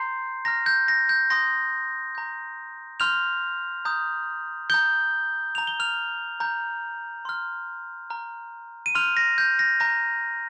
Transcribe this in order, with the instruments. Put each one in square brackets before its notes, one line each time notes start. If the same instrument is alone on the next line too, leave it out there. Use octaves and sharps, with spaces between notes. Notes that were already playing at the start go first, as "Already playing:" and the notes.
Already playing: [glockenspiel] A#5 C6 G6 C7
A#5 F6 A#6
G6
A#6
G6
C6 D#6 G6 A#6
A#5 G6
C6 F6 G6 F7
A#5 D#6 G6
A#5 D#6 G6 G7
A#5 G6 F7
G7
F6 F7
A#5 G6
C6 F6
A#5 F6
D#7
C6 F6 G6 F7
A#6
G6
A#6
A#5 G6 A#6